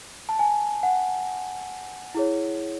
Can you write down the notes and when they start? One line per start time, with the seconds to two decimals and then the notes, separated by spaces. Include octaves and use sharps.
0.29 A5
0.39 G#5
0.83 F#5
2.14 E4 G#4 C#5